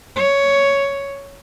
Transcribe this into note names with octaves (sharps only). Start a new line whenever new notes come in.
C#5